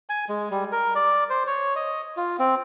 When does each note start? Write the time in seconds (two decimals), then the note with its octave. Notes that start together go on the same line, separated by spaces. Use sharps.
0.09 G#5
0.29 G#3
0.51 G3
0.72 A#4
0.95 D5
1.30 C5
1.47 C#5
1.76 D#5
2.17 F4
2.39 C4